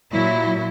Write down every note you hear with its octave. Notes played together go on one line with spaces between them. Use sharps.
A#2 F#3 E4